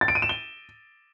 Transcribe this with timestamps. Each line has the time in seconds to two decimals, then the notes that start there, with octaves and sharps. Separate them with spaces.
0.01 A6
0.08 D7
0.15 D#7
0.22 E7
0.29 G7